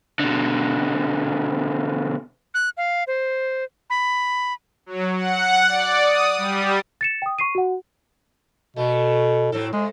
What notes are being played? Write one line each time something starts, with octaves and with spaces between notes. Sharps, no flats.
B2 D3
F#6
F5
C5
B5
F#3
F#5
D5
D#6
G3
A6 C#7 E7
G5 D#6
C#6 C7 D#7
F#4 F#5
B2 A3
A2 F#3 C4 A4
C3 G#3